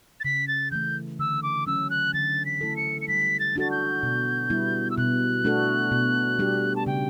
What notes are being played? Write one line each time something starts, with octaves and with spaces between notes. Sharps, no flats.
A6
C#3 B6
A6
E3 A3 G6
D3 E6
D6
F#3 C#4 E6
F#6
D3 A6
B6
A3 E4 A4
C#7
C#7
G3 B6
A6
D4 F#4 A4 A6
G6
B2
G3 B3 E4
E6
B2 F#6
A3 D4 F#4 A4
B2
G3 D4 G4
A5
C#3 G5